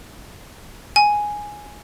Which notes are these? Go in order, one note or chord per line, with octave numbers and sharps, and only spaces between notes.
G#5